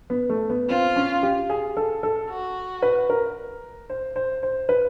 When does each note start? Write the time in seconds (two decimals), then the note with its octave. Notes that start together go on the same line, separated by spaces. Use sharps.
0.10 B3
0.30 A3
0.50 B3
0.69 C4 F4
0.96 C#4
1.23 G4
1.50 G#4
1.77 A4
2.03 A4
2.29 F#4
2.82 B4
3.10 A#4
3.90 C5
4.16 C5
4.43 C5
4.69 B4